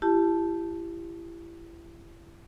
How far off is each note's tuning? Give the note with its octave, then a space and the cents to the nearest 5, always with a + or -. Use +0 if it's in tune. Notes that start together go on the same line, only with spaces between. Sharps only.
E4 +35 G4 +0 A5 -5